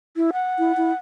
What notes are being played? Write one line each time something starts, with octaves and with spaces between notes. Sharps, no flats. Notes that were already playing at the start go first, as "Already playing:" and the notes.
E4
F#5
E4
E4